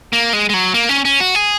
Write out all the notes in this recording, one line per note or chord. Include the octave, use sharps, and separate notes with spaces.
A#3
G#3
G#3
F#3
A#3
C#4
C#4
F#4
G#4